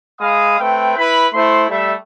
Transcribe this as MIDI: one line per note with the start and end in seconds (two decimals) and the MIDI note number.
0.20 0.59 56
0.20 0.59 77
0.20 0.59 83
0.20 0.59 87
0.60 0.96 57
0.60 0.96 60
0.60 0.96 71
0.60 0.96 79
0.98 1.28 64
0.98 1.28 71
0.98 1.28 83
1.34 1.66 57
1.34 1.66 64
1.34 1.66 72
1.34 1.66 84
1.70 1.94 55
1.70 1.94 57
1.70 1.94 76